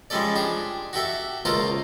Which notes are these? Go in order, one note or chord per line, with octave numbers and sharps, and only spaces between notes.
F3 G3 G#3 C#4 A4 D5
D4 G4 G#4
F#4 G4 A4 E5
C#2 A#3 F4 A4 A#4 C5